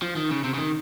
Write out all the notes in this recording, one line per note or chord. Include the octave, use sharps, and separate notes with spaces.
F3
D#3
C#3
C3
C#3
D#3